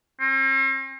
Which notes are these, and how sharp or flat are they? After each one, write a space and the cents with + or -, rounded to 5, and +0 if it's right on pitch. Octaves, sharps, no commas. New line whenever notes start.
C4 +45